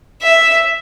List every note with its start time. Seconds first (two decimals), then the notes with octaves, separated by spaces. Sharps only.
0.22 E5